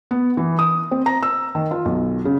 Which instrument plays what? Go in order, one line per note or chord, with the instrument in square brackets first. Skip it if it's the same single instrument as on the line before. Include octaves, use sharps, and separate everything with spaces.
[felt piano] B3
E3
D#6
C4
A#5
E6
D#3
F4
B1
C#3